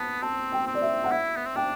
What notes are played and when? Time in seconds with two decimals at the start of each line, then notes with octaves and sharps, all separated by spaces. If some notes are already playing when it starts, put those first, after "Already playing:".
Already playing: B3 A5
0.22 C4 A5
0.52 G5
0.67 C4
0.74 D5
0.82 E5
1.04 F#5
1.11 E4 E5
1.36 B3
1.46 C4
1.56 D4 G5